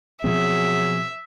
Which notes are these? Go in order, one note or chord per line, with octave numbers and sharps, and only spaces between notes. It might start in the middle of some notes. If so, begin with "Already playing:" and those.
B2 F3 F#3 C4 G#4 E5